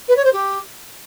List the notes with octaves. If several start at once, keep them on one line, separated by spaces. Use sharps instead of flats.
B4
C#5
C5
G4